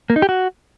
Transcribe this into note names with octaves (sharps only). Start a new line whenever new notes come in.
A#3
D#4
G4
F#4